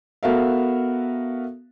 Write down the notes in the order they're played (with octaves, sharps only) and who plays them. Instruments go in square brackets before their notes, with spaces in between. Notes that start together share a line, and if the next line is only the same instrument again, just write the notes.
[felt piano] B3 F#4 A4 A#4 E5 F5